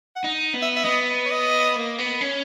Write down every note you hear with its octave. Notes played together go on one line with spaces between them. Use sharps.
F#5
D#4
B3
E5
E5
B3 D#5
C#5
D#5
A#3
B3
C#4